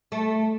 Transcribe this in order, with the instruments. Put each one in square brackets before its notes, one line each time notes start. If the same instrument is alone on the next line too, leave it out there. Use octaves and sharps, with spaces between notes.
[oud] A3